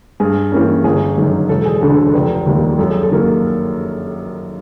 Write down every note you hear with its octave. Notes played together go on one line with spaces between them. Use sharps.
G2 G#4
E3 G3 A#3 C#4
G1 G#4
F#2 D#3
E1 A4
G#4
D2 D3 A4
A4
F1 B4
D#2 D#3 G3 A#3
F#2 A4
G#4
A4
D#3 F#3 A#3